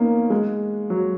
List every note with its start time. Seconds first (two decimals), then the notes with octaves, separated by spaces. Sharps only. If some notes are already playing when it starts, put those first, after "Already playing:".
Already playing: A#3 B3 C#4 D#4
0.30 G#3
0.90 F#3